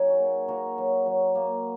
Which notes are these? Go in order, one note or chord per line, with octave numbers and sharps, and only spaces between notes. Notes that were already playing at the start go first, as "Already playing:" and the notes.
Already playing: F#3 D#4 G#4 C#5
F#4 A#4
A#3
A#3 F#4 A#4
F#3
F#3
A#3